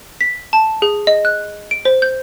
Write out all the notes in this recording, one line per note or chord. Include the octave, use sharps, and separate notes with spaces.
B6
A5
G#4
D#5
F#6
D7
C5
G6